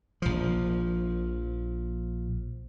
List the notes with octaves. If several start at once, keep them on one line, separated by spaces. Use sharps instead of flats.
A#1 F3